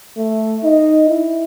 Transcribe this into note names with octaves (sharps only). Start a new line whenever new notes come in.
A3
D#4
E4